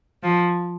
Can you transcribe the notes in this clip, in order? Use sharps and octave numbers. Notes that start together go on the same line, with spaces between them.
F3